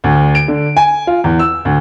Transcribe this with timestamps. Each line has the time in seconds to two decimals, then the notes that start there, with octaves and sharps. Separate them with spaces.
0.04 D2
0.35 D7
0.48 D3
0.76 G#5
1.07 F4
1.24 E2
1.39 E6
1.65 D2